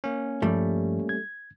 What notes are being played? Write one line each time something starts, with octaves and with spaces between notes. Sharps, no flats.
A#3 C#4
G2 F3 G3 A3
G#6